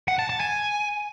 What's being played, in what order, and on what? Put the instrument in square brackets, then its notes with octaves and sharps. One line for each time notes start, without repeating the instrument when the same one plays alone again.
[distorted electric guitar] F#5
A5
A5
G#5